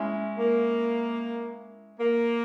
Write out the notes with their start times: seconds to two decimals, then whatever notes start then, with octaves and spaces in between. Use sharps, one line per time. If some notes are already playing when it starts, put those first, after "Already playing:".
Already playing: G#3 C#4 E4
0.39 A#3
2.00 A#3